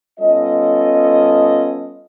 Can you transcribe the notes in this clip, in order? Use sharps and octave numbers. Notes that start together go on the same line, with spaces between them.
G3 B3 C#4 F4 A4 D#5